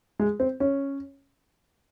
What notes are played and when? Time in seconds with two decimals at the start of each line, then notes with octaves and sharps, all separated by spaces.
0.19 G#3
0.40 C4
0.60 C#4